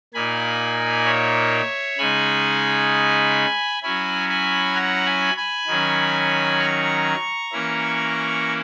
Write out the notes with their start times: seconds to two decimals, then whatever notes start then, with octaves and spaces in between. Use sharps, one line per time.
0.14 A#2 A#3 D#4 G#5 B5
1.05 C#5 E5
1.98 C#3 G#3 D#4 G#5 B5
3.83 F#3 C#4 E4 G#5 B5
4.29 G#5 B5
4.75 F#5 A#5
5.05 G#5 B5
5.36 G#5 B5
5.67 D#3 F#3 C#4
6.59 A#5 C#6
7.52 E3 A#3 C#4 E4